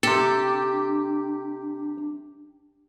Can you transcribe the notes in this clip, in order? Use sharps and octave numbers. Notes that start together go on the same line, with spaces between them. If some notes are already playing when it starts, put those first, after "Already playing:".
C3 D4 G4 A4